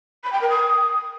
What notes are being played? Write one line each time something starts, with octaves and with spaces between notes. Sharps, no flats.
B5
G5
A#4
D#6